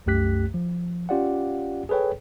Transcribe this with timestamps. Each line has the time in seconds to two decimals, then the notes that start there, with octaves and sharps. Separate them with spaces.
0.06 C2 F#2 A3 G4 F#6 B6
0.54 F3
1.09 C#4 F4 G4 D5 F5 F#5
1.89 G#4 A4 B4 C#5 G5